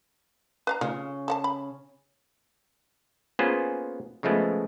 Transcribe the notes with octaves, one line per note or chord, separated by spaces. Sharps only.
B4 F5 A#5
C#3 F4
A4 F#5 A5
B5
A#3 B3 C#4 F4 G#4 C5
C#3 F3 G#3 A3 B3